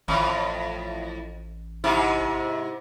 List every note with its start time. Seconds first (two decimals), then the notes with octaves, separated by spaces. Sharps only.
0.08 A1 F2 A2
1.84 G#2 C3 E4